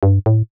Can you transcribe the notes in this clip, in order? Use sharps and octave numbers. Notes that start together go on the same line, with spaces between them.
G2
A2